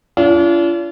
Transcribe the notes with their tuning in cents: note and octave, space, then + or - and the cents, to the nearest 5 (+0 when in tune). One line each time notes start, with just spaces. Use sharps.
D4 -40 F4 -40